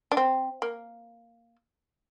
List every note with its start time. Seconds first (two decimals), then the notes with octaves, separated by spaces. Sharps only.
0.12 D4
0.17 C4
0.62 A#3